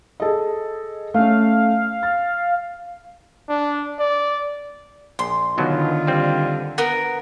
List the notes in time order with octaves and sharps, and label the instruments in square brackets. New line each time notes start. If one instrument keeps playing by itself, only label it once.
[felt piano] G#4 A4 D#5
[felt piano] A3 C#4 [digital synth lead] F5
[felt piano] A6
[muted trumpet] D4
D5
[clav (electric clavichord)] A#1 [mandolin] C6
[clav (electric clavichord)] B1 B2 F#3 [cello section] D3 [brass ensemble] D#3 D#4 F4
[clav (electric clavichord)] G3 C4
[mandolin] B3 A#4 [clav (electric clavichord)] F#5